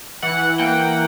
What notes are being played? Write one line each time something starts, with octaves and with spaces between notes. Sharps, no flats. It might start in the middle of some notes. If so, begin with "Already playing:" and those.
E3 F#5
A#3 G5